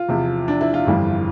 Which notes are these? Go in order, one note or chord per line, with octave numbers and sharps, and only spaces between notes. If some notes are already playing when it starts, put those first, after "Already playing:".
Already playing: F4
E2 C3 F3
D4
E4
F4
G1 F2 E3 G3